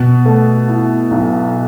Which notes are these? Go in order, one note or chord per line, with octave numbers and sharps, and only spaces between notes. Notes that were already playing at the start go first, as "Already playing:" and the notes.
Already playing: B2
A3
E4
B1